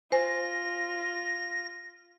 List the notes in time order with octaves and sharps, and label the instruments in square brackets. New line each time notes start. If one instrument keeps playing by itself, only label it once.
[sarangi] F4 [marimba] C5 G#5 [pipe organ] A#6